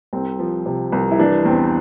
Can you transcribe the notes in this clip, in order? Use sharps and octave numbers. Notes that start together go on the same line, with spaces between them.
C2 C4
F3
C3
C2
E4
E3 D4
E2 C4